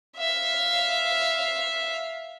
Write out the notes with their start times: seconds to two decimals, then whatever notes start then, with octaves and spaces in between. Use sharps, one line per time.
0.17 E5 F5